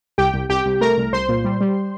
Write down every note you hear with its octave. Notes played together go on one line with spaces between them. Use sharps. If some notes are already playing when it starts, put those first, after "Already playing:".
C2 G4 G5
C2
C2 G4 G5
C2
A3 A#4 A#5
C2
C2 C5 C6
A#2
G3
G3